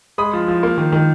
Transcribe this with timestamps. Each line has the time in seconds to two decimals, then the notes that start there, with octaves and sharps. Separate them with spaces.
0.18 G#3 B5 D#6
0.33 F3
0.48 F3
0.63 A#3
0.78 D#3
0.92 D#3